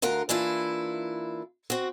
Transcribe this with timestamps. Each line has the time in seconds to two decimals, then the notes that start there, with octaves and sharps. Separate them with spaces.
0.02 D2 F4 A#4 F#5
0.29 E3 A#3 D4 E4 F4
1.70 C4 F#4